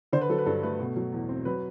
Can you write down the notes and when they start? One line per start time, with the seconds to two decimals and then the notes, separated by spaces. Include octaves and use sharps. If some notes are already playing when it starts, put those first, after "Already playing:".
0.13 D3 C5
0.21 B4
0.29 F#3 A4
0.38 B4
0.46 G2 A4
0.63 A3 B4
0.80 B2
0.96 F#3
1.13 E2
1.29 C4
1.45 F#3 B4